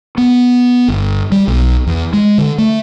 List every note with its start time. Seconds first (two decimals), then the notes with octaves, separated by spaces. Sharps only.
0.18 B3
0.88 G1
1.32 G3
1.48 B1
1.87 E2
2.13 G#3
2.38 D3
2.58 A3